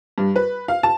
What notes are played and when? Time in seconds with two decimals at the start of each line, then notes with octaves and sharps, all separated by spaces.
0.18 G2
0.36 B4
0.68 F5
0.83 A5